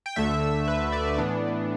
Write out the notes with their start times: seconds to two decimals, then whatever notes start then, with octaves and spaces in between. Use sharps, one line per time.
0.06 G5
0.16 D2 D3 A3 E5
0.68 B4
0.92 D5
1.18 A2 E3 B3 D4